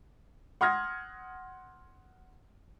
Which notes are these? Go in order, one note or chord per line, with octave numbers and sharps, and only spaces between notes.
F#5 C6 D#6 F6 G#6 A#6